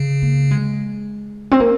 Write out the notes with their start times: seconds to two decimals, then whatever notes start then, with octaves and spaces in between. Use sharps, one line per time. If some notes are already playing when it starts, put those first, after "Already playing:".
Already playing: C#3
0.22 A#3
0.51 G#3
1.51 C4
1.60 A#3